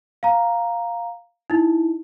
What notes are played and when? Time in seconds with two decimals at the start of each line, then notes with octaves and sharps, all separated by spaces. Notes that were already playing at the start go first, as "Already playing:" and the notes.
0.23 F5 A#5
1.50 D#4 E4